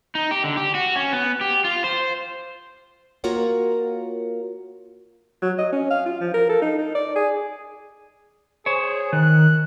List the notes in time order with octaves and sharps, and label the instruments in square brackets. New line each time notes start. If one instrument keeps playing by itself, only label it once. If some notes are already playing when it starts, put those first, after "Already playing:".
[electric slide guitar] D#4
G4
D3
G4
F#4
C#4
B3
G4
F4
C5
[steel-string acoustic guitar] A#3 F4 F#4 A#4 C#5 F#5
[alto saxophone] F#3
D#5
C#4
F5
F4
F3
A#4
A4
D#4
D#4
D5
G#4
[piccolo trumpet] G#4 [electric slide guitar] C5 C#5
[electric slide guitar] D#3 [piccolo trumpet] F#6